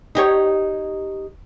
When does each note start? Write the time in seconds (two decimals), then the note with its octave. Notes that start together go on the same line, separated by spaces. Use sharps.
0.15 D#4 G4 C#5